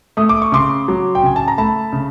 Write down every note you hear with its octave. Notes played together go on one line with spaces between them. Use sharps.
A3 D#6
D6
C#6
C#3 C6 D6
F#3
G5
C#3 G#5
A5
A#5
A3 A5 B5
C#3